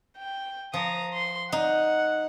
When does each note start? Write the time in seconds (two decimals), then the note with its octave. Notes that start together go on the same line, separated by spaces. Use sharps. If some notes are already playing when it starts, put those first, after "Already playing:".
0.17 G5
0.74 F3 A#5 D#6
1.13 C6
1.52 D#4 F#5